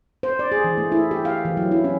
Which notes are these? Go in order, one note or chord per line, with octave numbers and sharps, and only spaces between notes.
C5
D5
G#4
E3
A3
E4
G4
F5
E3
F#3
E4
C#4